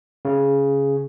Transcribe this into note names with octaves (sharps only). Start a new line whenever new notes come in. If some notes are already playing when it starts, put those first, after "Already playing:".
C#3